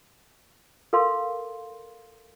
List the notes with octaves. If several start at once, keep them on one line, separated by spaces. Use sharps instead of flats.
A4 A#4 F5 C6